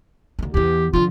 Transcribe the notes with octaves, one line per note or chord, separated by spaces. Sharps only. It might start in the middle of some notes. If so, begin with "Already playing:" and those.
D2 D#3
E2 E3 G4
D3 F3 F4